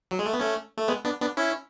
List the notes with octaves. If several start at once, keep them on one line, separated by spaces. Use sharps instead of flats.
F#3
G#3
A3
B3
A3 C#4
A3
G#3 B3
B3 D4
B3 D4
C#4 E4